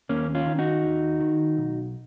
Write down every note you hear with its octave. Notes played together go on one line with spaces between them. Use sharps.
D#2 A#3 C#4
C#4 F4
D#3
D#4 F#4
D#2
D#3
B1